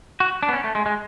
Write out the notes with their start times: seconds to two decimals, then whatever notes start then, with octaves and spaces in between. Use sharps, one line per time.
0.20 F#4
0.43 D4
0.49 B3
0.53 C#4
0.64 A3
0.75 G#3
0.86 G#3